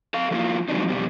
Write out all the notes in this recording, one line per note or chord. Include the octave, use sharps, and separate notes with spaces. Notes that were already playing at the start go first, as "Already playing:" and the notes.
A4 F5
F3 F#3 A3 A#3 E4 F4
F3 F#3 G#3 C4 D4 D#4
F2 B2 G3